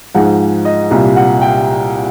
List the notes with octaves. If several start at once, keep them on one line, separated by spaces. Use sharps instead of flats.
G#2 F3 G#3 F#5
D#5
C2 A#2 G3 F5
F#5
G5